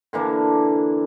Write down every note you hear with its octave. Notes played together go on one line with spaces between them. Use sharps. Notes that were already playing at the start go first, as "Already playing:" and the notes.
D3 E3 A#3 D4